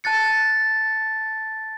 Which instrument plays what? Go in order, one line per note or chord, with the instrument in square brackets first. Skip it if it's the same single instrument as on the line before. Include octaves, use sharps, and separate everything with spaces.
[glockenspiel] A5 F#6 A6 C#7